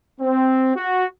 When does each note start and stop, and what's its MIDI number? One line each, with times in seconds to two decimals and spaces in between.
0.21 0.76 60
0.76 1.06 66